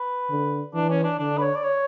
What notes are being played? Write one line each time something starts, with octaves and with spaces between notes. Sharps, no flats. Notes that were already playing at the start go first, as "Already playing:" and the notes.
Already playing: B4
D3
E3 D4
C#4
D4
D3 D4
B4
C#5
D5
C#5